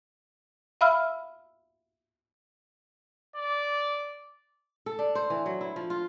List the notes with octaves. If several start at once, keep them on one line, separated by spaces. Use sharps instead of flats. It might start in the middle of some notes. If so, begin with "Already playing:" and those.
E5 F5 B5 E6 F6
D5
A4
D4
C5
E3
F#3
E4
F3
F4